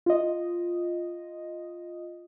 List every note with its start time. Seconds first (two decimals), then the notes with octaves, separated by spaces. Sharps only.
0.06 F4 D#5